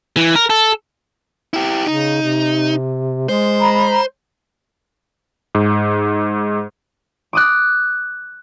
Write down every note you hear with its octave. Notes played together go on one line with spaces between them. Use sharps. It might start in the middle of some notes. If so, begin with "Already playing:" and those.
E3
A#4
A4
E4 G4
C#3 D#4
C3
G#3 C5
A#5 B5
G#2
D6 D#6 F#6